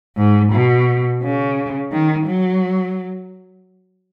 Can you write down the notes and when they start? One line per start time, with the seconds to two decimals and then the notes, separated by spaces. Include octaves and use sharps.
0.17 G#2
0.53 B2
1.23 C#3
1.92 D#3
2.26 F#3